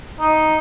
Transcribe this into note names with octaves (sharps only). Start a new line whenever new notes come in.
D#4